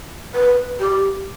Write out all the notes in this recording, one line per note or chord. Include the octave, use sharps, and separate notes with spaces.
B4
G4